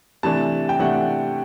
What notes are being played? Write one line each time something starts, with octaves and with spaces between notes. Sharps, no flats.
C3 E3 A3 D4 A5
G5
C3 E3 A3 D4 F#5